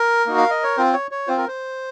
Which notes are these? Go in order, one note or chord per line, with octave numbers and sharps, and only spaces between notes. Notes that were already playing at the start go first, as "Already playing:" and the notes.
Already playing: A#4
A#3 D#4 F#4
F5
D#5
C#5
C4 F4 C5
C#5
C#5
C4 F4 C5
A#4
C5